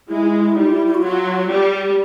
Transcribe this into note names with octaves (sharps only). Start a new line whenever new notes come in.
G#3 E4
E4
E4
G3 D#4
F4
E4
E4
F#4
F#3 F4
G3